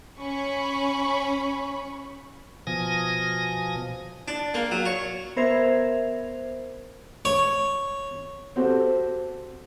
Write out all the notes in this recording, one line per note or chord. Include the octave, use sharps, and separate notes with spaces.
C#4 B5 C#6
B2 F3 G#5 D#6 A#6
D4
A#3
F#3
C#5
B3 A#4 C5 E5 G#6 F7
C#5
C4 F#4 G4 A4 C5